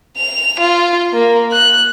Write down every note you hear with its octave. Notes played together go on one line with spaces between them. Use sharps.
F7
F4
A#3
F#6